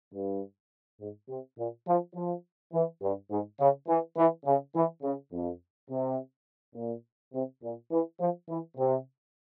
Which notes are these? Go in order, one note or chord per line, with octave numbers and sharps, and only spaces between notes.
G2
G#2
C3
A#2
F3
F3
E3
G2
G#2
C#3
E3
E3
C#3
E3
C#3
F2
C3
A#2
C3
A#2
E3
F3
E3
C3